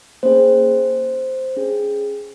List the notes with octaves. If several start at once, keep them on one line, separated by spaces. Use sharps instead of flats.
A#3 C#4 G#4 C5
C#4 G#4